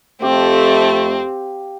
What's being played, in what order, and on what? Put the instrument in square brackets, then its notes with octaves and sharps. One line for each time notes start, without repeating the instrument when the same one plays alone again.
[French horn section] F2 A3 [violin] C4 [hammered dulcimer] G4 F5